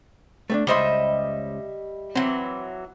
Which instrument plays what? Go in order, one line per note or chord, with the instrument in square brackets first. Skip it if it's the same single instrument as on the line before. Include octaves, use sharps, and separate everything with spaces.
[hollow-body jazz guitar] A3 C4 D4
[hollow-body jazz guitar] C#2 C5 C6 [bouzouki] G3 D#5 E5
[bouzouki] E3 F#3 [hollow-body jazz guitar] C4